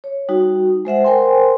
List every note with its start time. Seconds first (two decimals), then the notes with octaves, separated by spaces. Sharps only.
0.04 C#5
0.29 G3 D#4 F#4
0.85 G#3 C5 E5 F#5
1.04 A#4 C5 G5 G#5 C6